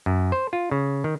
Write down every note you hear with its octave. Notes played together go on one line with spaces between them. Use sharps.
F#2
C5
F4
C#3
D#3